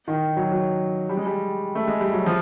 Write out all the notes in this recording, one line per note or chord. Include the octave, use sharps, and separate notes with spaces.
D#3
F#3
F#3
G3
G#3
G3
A3
G#3
G3
F#3
F3